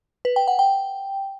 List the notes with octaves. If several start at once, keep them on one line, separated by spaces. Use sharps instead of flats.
B4
G5
F#5
G5